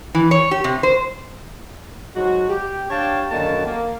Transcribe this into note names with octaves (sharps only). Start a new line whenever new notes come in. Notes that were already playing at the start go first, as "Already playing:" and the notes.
E3
C#5
G4
C3
C5
G#2 F#3 G#3 F#4
G4
D4 G4 C#5 F5 G5 A5
F#2 D3 D#3 A#3 F#4 A5
A#3